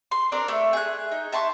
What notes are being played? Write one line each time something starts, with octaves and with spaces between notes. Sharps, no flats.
C6
C4 D4 A#4 D5
A3
G#4 F#6
D#4
E5 A5 C6 C#6